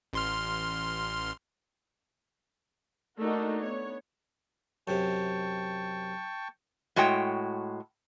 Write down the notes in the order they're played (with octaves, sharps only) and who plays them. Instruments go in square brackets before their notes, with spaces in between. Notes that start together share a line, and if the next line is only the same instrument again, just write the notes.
[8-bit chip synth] A1 C6 F6
[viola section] A3 A#3 D4 D#4 F#4 A#4
B3 C#5
[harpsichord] F#2 C3 [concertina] G5 A5 C#6
[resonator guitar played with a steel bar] A2 G#3 F#4 C#5 G5